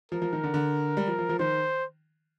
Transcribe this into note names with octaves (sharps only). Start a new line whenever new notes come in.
F3 A#4
F3
D#3
D3
D3
G3
F3
F3
F3
D#3 C5